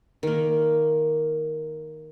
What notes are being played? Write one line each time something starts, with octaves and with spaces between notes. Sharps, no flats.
D#3 A#3